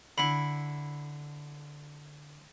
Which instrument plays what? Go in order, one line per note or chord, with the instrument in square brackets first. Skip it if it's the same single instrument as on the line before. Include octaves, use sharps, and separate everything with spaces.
[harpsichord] D3 E4 [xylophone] B5 F#7